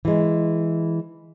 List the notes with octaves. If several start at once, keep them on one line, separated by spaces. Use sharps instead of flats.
E3 G#3